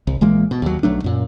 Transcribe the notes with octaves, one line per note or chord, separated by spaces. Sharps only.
C2
A#1 E3 G#3 A#3
B2
D#2 F#3
B1 F#3 A3 D4
F#2 A#2